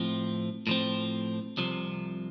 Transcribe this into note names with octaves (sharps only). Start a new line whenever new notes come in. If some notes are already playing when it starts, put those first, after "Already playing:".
Already playing: A2 F3 C4
A2 F3 C4
C2 C3 F3